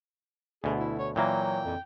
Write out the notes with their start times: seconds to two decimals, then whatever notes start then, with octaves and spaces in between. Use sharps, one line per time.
0.64 D2 B2 G#4
0.79 E4
0.99 C#5
1.16 A#2 E3 F#3 A#3 G5
1.65 F2